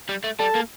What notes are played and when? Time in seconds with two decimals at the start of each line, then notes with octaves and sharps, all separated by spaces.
0.09 G3
0.24 A3
0.39 G3 A4 A5
0.55 A#3